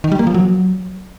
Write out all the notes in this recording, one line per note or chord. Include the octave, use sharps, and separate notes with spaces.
D#3
G3
A#3
F3
F#3